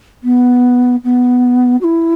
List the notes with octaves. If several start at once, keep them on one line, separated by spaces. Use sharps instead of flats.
B3
B3
F#4
E4